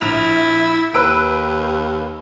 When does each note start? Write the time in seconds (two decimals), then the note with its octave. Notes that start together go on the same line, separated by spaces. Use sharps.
0.01 A#1 E4 F7
0.94 D#2 B4 E6 D7